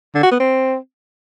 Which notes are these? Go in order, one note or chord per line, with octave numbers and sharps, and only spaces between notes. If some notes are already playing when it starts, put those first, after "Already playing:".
D3
F#4
B3
C4